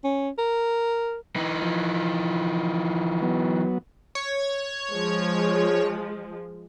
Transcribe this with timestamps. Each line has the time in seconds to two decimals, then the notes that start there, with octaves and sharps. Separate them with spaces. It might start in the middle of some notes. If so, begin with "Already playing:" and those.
0.04 C#4
0.38 A#4
1.36 E3 D#4
1.62 F3
3.22 F#3 B3
4.15 C#5
4.92 F3 G#3